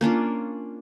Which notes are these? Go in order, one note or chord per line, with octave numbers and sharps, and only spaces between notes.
A#3 C#4 D4 F4